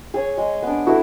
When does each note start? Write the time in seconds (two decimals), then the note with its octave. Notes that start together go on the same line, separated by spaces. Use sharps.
0.14 G#4 C#5
0.37 G#3
0.63 B3 D4
0.87 E4 F#4 A4